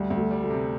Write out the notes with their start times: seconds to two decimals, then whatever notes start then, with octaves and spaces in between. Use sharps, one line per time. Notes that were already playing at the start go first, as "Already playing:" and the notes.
Already playing: D2 G3
0.10 D2
0.17 A3
0.31 G3
0.44 A3
0.50 C3